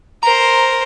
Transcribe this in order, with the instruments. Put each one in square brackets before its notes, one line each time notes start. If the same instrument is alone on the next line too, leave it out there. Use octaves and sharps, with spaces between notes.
[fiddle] A#4 C5 [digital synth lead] A#5